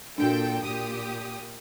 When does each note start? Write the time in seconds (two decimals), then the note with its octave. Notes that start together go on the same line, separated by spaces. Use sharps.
0.18 A#2 D4 F#4 A4 G5
0.65 A#2 G4 D#6